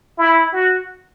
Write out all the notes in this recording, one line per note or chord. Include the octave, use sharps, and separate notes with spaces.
E4
F#4